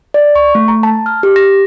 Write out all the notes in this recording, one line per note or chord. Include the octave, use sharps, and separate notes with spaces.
D5
C#6
A3
A#5
A5
F6
G4
A#6